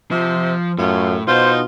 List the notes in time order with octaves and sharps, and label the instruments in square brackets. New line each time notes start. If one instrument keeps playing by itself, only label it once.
[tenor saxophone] C3 [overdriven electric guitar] F3
[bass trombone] F#2 [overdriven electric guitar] A2 [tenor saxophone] F4
[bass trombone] B2 [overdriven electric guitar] D#4 [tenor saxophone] F4 [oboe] C5